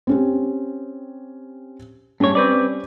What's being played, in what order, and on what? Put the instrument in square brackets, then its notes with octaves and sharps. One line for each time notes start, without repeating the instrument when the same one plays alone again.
[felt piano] C4 C#4 G4
[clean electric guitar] G2 C#5 [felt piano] G3 C#4
[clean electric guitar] C4 B4 D5